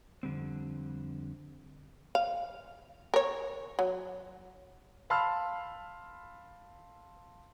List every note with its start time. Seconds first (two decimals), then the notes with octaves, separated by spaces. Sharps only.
0.23 F2 D3 G3 C4
2.15 F5
3.14 A#4 C#5
3.79 F#3
5.10 F5 A5 B5 C6 E6 F6